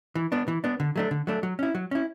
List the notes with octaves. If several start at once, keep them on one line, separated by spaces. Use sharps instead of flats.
E3
B3 D4
E3
B3 D4
D3
F#3 A3 D4
D3
F#3 A3 D4
F#3
C#4 E4
F#3
C#4 E4